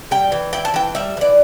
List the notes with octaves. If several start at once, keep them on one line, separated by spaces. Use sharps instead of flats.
G3 G5
E3
E4 G5
A5
E3 G5
G3 E5
E3 D5